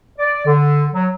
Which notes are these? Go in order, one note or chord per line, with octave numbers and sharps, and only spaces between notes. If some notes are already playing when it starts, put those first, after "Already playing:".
D5
D3
F#3